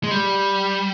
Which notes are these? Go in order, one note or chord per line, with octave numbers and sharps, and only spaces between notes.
G#3
G3